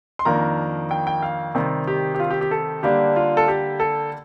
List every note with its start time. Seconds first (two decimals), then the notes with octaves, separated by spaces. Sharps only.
0.19 C6
0.25 F2 D#3 A#3 D4 A#5
0.91 G5
1.07 G5
1.22 F5
1.55 C3 D#3 G3
1.87 G4
2.14 G4
2.20 F4
2.30 G4
2.41 G4
2.51 A4
2.83 D3 G3 A#3 D4 G4
3.16 F4
3.37 A4
3.48 G4
3.80 A4